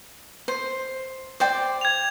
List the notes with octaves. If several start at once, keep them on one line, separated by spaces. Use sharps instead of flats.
C5
C5 D5 G5
G#6 F7